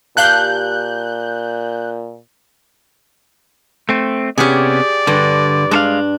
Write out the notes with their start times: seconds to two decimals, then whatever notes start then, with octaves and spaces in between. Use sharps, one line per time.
0.17 A#2 G4 F5 A5 F#6 G6
3.89 A3 C4
4.38 C3 B3 C#4 G4 G#4 D5
5.07 G2 D3
5.71 G#3 D4 A4 F5